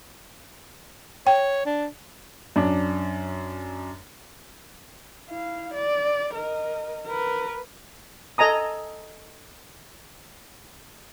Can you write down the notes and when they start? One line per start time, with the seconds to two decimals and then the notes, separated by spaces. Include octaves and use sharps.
1.27 C#5 G5
1.66 D4
2.56 F#2 D4
5.30 E4 F5
5.74 D5
6.34 A#4 D#5
7.06 A#4 B4
8.38 A4 D#5 G#5 A#5 D#6